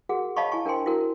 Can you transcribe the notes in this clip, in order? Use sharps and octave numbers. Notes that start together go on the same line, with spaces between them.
F#4 G#4 A#4 F#5
C#5 D#5 F5 A5 B5 C#6
E4 G#5 A5 C#6
D4 A#4 C5 G5 G#5 C6
E4 F#4 A#4